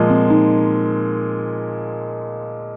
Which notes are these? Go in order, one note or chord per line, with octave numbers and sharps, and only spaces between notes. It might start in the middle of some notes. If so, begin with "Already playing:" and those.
Already playing: A#2 F3 G#3
C4
D#4